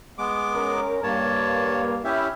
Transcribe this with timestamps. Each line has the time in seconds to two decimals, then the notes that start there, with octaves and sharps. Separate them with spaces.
0.18 G#3 B3 D6
0.54 C#4 A#4
1.03 G2 A#3 C#5 A5
2.04 C#4 E4 G4 E5